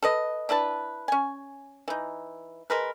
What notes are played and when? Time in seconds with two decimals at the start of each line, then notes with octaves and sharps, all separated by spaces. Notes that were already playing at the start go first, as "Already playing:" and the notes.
0.03 A4 B4 D#5
0.49 D4 E4 B4 A5
1.08 C#4 G#5
1.88 E3 D#4
2.70 G#3 A#4 B4